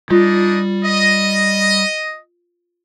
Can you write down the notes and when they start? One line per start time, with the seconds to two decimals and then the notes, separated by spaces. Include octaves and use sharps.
0.10 G3 D4 D#4 F4 D#5
0.85 D#5